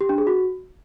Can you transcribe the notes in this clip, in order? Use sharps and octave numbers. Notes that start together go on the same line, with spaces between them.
G4
D4
G#4
F#4